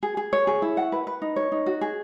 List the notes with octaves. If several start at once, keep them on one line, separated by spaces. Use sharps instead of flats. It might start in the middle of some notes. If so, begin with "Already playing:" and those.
G#4
G#4
C#5
G#4
E4
F#5
B4
B4
D#4
C#5
D#4
F#4
G#4